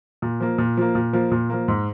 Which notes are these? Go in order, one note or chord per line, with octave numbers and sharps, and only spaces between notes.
A#2
F3 A#3
A#2
F3 A#3
A#2
F3 A#3
A#2
F3 A#3
G#2